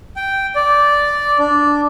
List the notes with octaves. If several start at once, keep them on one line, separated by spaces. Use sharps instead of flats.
G5
D5
D4